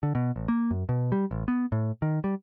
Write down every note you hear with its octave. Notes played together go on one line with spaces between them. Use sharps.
D3
B2
A1
A#3
F#2
B2
G3
A1
B3
A2
D#3
G3